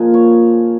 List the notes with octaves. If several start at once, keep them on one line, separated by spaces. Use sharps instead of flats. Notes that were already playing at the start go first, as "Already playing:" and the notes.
Already playing: A#2 F3 A#3 G#4
C#5